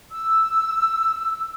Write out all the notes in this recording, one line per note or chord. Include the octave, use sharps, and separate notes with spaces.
E6